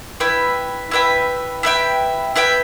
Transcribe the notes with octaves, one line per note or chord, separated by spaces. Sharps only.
E4 B4 E5 G5
E4 B4 E5 G5
E4 B4 E5 G5
E4 B4 E5 G5